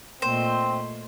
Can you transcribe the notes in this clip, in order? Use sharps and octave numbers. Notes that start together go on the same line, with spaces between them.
A#2 A3 C4 C5 D#5